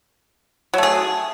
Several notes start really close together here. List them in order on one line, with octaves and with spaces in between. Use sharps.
F#3 A3 G#4